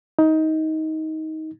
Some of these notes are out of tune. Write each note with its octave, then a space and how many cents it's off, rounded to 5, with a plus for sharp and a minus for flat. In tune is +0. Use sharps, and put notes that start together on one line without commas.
D#4 +20